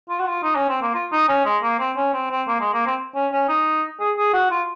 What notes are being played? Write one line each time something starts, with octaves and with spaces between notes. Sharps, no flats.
F4
F#4
F4
D#4
C#4
C4
A#3
F4
D#4
C#4
G#3
A#3
C4
C#4
C4
C4
A#3
G#3
A#3
C4
C#4
C#4
D#4
G#4
G#4
F#4
F4